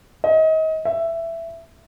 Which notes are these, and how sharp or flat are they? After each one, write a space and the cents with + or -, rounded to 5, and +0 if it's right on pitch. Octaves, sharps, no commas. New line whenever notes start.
D#5 +30
E5 +10